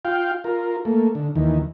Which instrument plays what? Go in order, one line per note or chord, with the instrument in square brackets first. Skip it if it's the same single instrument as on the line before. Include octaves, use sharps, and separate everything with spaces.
[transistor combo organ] F4 F5 G5
F4 A#4
A3 A#3
D3
D#2 D#3 E3